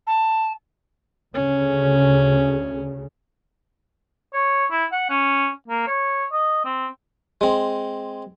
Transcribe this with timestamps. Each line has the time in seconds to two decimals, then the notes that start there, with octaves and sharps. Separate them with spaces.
0.07 A5
1.34 D2 C#3 C#4
4.33 C#5
4.71 E4
4.92 F#5
5.10 C#4
5.68 A#3
5.87 C#5
6.32 D#5
6.65 C4
7.41 G#3 C4